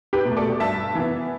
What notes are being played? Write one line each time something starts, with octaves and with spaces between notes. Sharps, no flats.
G4 B4
B2 A3
A4 D5
G2 E5 A5
E3 B3